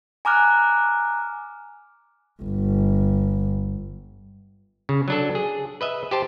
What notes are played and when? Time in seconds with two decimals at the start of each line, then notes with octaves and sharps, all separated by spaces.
0.25 G#5 A#5 D6 F6 F#6
2.43 G1
4.89 C#3
5.08 F#3 D4 A4
5.35 G#4
5.81 B4 D#5 E5
6.11 G4 C5 A5